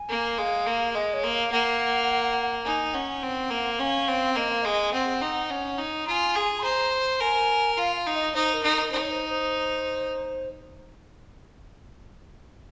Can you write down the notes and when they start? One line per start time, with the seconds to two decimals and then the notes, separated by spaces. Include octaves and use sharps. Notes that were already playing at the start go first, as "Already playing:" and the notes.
Already playing: G#5
0.09 A#3
0.38 G#3 F5
0.66 A#3
0.94 G#3 D#5
1.14 C#5
1.24 A#3
1.32 F5
1.51 A#3 F#5
2.65 D#4 G#5
2.94 C#4 F#5
3.23 C4
3.50 A#3
3.79 C#4 F5 F#5
4.08 C4
4.36 A#3 D#5
4.49 F5
4.62 G#3 D#5
4.93 C4 F#5
5.21 D#4
5.50 C#4
5.78 D#4
6.06 F4 G#5 A#5
6.36 G#4
6.59 C6
6.64 C5 A#5
7.21 A#4 G#5
7.77 F4 F5
7.96 F5
8.06 D#4
8.16 D#5
8.34 D#4 C5
8.54 A#4
8.63 D#4
8.72 A#4
8.91 D#4 C5
9.01 C#5
9.10 C5
9.30 C5